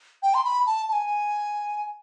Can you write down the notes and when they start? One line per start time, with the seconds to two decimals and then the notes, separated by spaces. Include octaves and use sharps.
0.23 G5
0.34 C6
0.44 B5
0.66 A5
0.89 A5
0.93 G#5